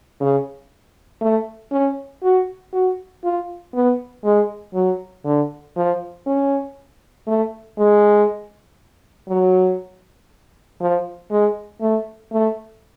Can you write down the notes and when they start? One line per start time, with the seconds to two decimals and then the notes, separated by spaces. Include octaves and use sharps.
0.20 C#3
1.21 A3
1.72 C#4
2.23 F#4
2.73 F#4
3.24 F4
3.74 B3
4.24 G#3
4.74 F#3
5.25 D3
5.76 F3
6.26 C#4
7.27 A3
7.78 G#3
9.29 F#3
10.81 F3
11.31 G#3
11.81 A3
12.32 A3